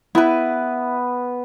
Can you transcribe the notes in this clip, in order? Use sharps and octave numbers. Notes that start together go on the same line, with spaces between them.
B3 E4 B4